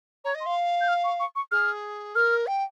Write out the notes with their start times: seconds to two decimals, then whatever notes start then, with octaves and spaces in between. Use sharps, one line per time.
0.24 C#5 A#5
0.35 D#5
0.40 C6
0.46 F5
0.81 G6
0.88 F6
1.04 C#6
1.20 C#6
1.36 C#6
1.52 G#4 F6
2.15 A#4 F6
2.47 G5